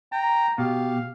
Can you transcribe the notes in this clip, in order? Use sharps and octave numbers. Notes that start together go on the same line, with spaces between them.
G5 A#5
B2 G4 F5